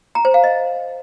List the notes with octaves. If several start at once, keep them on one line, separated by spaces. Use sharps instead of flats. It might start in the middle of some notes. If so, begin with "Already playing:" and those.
A#5
C5
F5
D#5